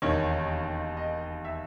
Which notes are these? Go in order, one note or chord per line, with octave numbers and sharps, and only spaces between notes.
E1 D#2 D#3 C#5
D#5
E5